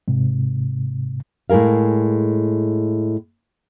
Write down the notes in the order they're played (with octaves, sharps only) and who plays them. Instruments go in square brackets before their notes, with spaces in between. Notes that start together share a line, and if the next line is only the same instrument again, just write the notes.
[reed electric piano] G#2 C3
[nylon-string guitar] A2 G#3 G#4 A#4 F5